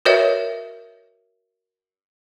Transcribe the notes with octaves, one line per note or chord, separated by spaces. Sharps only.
F#4 A#4 B4 C#5 D#5 E5